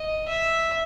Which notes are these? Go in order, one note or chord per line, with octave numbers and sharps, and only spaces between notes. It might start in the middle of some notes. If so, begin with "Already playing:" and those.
Already playing: D#5
E5